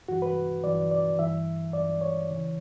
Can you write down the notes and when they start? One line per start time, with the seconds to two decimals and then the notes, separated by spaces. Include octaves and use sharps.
0.08 G2 E3 F#4
0.22 B4
0.63 G2 E3 D5
0.91 D5
1.19 G2 E3 E5
1.73 G2 E3 D5
2.01 C#5
2.29 C#2 C#3 E3